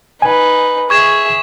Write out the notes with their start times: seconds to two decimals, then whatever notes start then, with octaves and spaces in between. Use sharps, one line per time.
0.22 D#4 B4 G#5
0.90 G#4 E5 C#6 G#6 E7